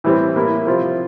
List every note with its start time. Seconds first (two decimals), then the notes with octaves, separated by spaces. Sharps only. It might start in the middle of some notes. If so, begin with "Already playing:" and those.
0.04 A2 E3 G3 C4
0.36 A2 G3 A#3 E4
0.67 C3 F3 C4 F4